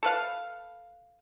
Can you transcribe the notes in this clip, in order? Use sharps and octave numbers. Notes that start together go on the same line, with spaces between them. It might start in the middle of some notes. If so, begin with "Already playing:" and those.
A4 B4 F5